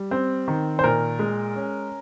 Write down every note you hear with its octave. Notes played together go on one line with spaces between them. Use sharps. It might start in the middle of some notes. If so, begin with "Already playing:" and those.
Already playing: G3
C4
D#3
C5
A#2 A#4
G#3
C#4